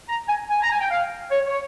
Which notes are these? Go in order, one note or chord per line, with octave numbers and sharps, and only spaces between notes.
A#5
G#5
G#5
A#5
G#5
G5
F5
C#5
C#5